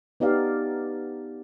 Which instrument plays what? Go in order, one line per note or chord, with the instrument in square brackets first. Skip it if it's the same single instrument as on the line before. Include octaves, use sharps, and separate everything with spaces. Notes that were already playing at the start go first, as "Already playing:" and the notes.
[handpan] B3 D#4 G4 D5 F5